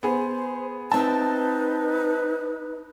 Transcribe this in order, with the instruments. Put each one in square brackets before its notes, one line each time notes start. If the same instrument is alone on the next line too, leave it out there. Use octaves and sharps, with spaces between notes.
[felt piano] B3 G#4 [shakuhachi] C5
[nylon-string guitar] C4 E5 [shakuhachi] D#4 [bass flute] B4 [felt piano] A5